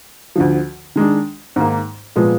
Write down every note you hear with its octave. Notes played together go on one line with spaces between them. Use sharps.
D2 D3 F3
D#3 G#3 D4
G#2 D#3 A#3
A#2 F3 G#3 B3 F4